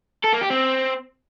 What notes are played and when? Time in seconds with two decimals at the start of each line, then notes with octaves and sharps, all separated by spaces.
0.24 A4
0.33 A#3
0.42 G4
0.50 C4